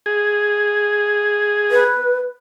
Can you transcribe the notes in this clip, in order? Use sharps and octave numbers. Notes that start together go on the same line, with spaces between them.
G#4
B4